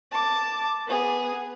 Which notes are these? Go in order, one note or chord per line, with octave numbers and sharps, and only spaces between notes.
A5 D6
B3 G#4